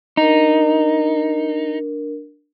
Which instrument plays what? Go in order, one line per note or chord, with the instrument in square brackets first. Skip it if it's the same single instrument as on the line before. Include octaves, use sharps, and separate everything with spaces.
[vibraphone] D4 A#4 [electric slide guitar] D#4